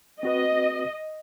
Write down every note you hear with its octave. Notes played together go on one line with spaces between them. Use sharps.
C4 F#4 B4 D#5